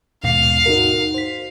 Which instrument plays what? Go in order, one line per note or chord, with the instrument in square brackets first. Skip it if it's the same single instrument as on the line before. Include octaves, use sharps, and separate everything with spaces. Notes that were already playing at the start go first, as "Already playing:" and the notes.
[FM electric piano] D#2 G#2 B2 [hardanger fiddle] F5
[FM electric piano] D#4 F#4 A#4
C5 B6